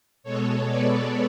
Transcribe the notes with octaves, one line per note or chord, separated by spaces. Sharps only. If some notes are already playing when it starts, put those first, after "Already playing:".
B2 G#3 B3 A4 C#5
B4 D5